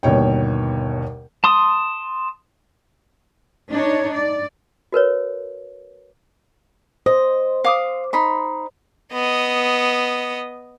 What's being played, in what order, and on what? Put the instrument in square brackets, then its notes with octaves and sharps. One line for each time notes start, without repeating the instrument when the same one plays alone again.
[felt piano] G1 D#2 B2 C#5 G5
[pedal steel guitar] A5 C6 D#6
[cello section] D4 D#4 C#5
D5
[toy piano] F#4 A#4 B4 C#5
[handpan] C5 [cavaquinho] D#5
[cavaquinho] F5 D6 D#6
D#4 B5 C6
[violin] B3 D#5